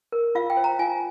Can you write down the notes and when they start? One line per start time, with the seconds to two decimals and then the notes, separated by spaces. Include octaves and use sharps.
0.12 A#4
0.35 F4 F5
0.50 G5
0.57 C5
0.64 A#5
0.79 F4 G#5